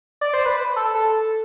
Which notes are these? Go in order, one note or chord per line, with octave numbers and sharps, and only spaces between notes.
D5
C5
B4
A4
A4